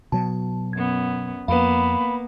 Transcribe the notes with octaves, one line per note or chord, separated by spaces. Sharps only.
B2 F#3 A5
F#2 B3 G#6
F2 A#3 B3 B4 F5 B5